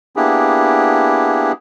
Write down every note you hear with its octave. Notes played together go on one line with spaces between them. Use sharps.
A#3 B3 D4 E4 G4 G#4